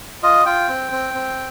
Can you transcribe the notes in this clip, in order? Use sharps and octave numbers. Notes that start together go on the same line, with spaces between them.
F4 D#5
F4 G5
C4
C4
C4